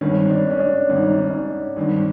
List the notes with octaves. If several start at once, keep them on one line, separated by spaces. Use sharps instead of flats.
G#1 G2 D#3 C#4
D4
C#4
D4
G#1 G2 D#3
D#4
D4
D#4
C#4
D4
G#1 G2 D#3 D4